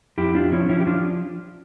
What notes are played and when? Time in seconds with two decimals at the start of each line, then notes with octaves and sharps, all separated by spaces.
0.18 F2 E4 G4
0.34 F3 D4 F4
0.52 F3 C#4 E4
0.69 F3 C#4 E4
0.80 G4
0.87 F3 D4 F4